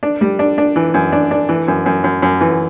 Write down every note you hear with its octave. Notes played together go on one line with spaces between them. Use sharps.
D4
G3
D4
D4
E3
F#2
D4
D4
E3
F#2
F#2
F#2
F#2
E3